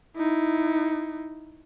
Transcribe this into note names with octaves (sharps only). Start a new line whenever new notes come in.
D#4 E4